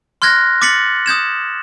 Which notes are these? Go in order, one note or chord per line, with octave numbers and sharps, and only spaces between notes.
C6 F6 F#6 G#6 A#6
D6 A6 B6 C#7 F#7
D#6 G6 G#6 E7